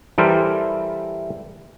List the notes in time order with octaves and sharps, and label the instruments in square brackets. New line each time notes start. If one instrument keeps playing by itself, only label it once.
[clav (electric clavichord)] E3 G3 A4 A#4 C5